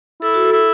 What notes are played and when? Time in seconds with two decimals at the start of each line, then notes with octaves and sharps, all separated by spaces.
0.22 E4 A4
0.34 F#4
0.45 A4
0.52 E4